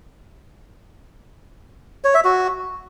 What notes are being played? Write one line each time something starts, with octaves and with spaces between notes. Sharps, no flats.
C#5
E5
F#4